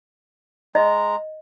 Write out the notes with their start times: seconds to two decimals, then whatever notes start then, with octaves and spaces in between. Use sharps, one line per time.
0.75 G#3 D#5 A#5